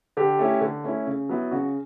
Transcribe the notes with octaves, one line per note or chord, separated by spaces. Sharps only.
D3 G4
A3 C#4 E4
D3
A3 C#4 E4
C#3
F#3 B3 E4
C#3 F#4